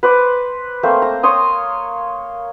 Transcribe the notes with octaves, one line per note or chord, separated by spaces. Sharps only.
B4 C5 D6
A3 A#3 C4 C5
A#5
C#5 C6 D#6